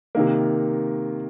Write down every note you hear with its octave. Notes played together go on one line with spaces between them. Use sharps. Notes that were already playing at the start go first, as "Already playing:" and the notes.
C3 D#3 A#3